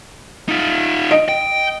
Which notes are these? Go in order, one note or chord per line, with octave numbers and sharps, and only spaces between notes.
D#4 F4
D#5 D7
G5